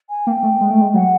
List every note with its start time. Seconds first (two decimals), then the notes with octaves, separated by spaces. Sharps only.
0.10 G#5
0.27 A#3 G5
0.43 A3
0.61 G#3
0.71 A3
0.82 G#3
0.94 F#3 F#5